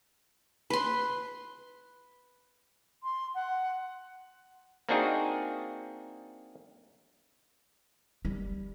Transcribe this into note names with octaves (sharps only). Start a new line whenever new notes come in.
B4 C6
C6
F#5
A#3 C4 D4 D#4 F#4 G#4
G3